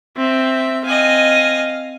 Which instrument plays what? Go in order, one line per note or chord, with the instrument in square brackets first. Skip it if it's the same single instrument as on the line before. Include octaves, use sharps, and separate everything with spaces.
[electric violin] C4 [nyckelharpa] E5
[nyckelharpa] C4 [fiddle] D#5 G#5 [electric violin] F5